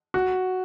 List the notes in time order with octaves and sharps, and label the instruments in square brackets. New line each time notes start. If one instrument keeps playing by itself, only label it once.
[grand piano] F#4